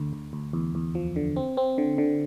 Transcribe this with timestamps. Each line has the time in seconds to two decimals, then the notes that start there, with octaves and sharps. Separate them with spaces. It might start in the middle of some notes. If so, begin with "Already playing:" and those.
Already playing: D2 D3
0.13 D2
0.33 D2
0.53 E2
0.75 E2
0.95 F3
1.16 D3
1.36 C4
1.57 C4
1.78 D3
1.98 D3